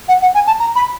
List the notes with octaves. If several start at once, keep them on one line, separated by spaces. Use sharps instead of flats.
F#5
F#5
G#5
A5
A#5
B5